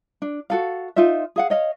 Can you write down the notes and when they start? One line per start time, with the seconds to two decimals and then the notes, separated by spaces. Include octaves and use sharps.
0.22 D4
0.50 F#4 A4 F5
0.96 D#4 F4 C5 E5
1.36 G#4 F5 F#5
1.50 C#5 D#5 F5